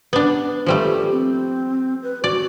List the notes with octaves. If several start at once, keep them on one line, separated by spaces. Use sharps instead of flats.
B3 D4
F3 G3 A3 G4
C4
B4
F#4 D5